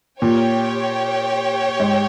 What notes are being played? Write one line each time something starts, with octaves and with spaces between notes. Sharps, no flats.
A#2 G4 C#5 G5
G#2